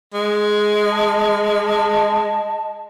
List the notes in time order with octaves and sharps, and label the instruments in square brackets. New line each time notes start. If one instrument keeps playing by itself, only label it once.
[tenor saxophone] G#3
[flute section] D#5 A5